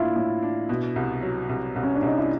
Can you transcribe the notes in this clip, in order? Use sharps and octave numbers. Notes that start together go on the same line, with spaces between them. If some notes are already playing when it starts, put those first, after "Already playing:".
Already playing: A2 A#3 D4 E4 F4
A2
D4
B2
C2
F#3
C2
C2
C#4
D4
C2 D#4
E4